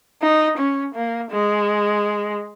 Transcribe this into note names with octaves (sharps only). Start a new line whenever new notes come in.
D#4
C#4
A#3
G#3